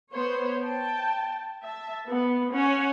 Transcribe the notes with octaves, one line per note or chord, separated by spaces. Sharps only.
B3 C5 C#5
G5 A5
E5 A5
B3
C#4 C#5 F#5 G#5